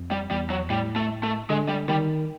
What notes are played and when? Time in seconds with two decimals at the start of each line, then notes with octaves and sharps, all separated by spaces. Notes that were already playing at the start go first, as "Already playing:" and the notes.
Already playing: F2
0.11 G3
0.31 E2 G3
0.50 F#3
0.70 A2 G3
0.96 A3
1.23 A3
1.50 D3 G#3
1.68 G3
1.88 D#3 G3